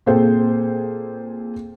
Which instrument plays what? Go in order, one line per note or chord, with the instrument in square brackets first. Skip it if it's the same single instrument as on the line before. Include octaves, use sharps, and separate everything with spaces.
[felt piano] A#2 C4 G#4 A4 C5 G5